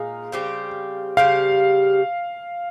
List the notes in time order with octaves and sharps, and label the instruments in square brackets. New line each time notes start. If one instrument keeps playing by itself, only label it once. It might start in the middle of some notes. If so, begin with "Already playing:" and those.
Already playing: [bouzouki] A#2 G#3 D#4 G#4 [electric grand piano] F5
[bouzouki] C#3 G3 C4 G4
[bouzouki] C#3 G3 C4 G4 [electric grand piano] F5